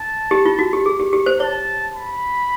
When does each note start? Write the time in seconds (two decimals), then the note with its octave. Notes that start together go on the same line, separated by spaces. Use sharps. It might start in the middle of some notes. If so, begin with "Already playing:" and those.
Already playing: A5
0.31 G4
0.45 F4
0.59 F#4
0.73 G4
0.86 G#4
0.99 G4
1.13 G4
1.26 C5
1.40 C#5 A5
1.95 B5